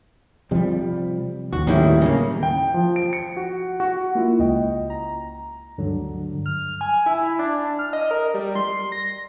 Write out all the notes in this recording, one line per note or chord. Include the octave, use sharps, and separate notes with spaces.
C3 F3 G3
D#2 F#4
D#2 A2 D#3 G3 C#4 E4
C#3 A#3
G5
F3
D7
C#7
F#4
F#4
A#3 E4 F4
C#2 D#5 G5
A#5
D2 G2 D3 F#3
F6
G#5
E4
D4
F6
D#5
A#4
G3
C6
A#6